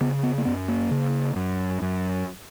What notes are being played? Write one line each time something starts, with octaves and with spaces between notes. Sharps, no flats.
C#3 B3
B3
A#3
F#2 B3
A#3
C#3
F#2
F#2